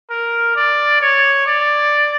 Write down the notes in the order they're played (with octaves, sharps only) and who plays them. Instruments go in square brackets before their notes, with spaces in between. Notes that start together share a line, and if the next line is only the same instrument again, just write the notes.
[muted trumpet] A#4
D5
C#5
D5